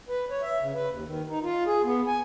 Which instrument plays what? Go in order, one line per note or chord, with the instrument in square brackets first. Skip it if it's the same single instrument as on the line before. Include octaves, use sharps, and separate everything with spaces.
[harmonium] B4
C#5
E5
C#3
B4
D#2
D#3
D#4
F4
G#4
B3
G#5